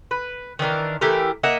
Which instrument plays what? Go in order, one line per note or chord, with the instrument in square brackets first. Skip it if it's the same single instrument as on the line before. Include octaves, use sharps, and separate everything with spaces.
[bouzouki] B4
D#3 E3 D4 A#4
E3 A3 G4 A#4
A#3 D#5 E5 F#5